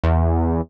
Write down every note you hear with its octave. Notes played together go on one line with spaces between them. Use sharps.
E2